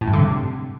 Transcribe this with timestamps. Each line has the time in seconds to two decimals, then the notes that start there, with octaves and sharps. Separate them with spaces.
0.01 A2
0.07 G2
0.13 D3
0.19 C3